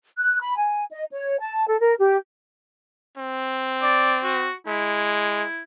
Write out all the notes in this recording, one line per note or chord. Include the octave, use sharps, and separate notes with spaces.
F#6
B5
G#5
D#5
C#5
A5
A4
A#4
G4
C4
D5
F#4
G#3 E4